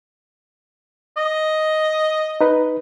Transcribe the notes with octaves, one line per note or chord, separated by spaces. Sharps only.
D#5
D#4 B4